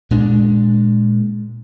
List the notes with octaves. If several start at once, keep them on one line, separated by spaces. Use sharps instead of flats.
A#2 G#3 D4